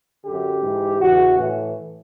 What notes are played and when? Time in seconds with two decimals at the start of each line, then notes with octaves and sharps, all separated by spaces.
0.24 F#2 D3 G4
0.61 G#2 E3
0.99 E2 C#3 E3 F#4
1.37 A2 E3